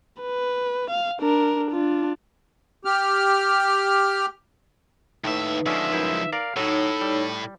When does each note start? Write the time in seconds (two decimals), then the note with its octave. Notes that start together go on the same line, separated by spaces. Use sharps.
0.22 B4
0.90 F5
1.21 D4 A#4
1.71 D4 F4
2.85 G4 F6
5.24 D#2 A2 D#4 B4 E5
5.66 D3 F3 G#3 C#4 E5
5.93 F#2 E4 C5
6.33 A#4 D5 F5
6.56 A2 F#3 D#4 A4 C#5
7.01 G3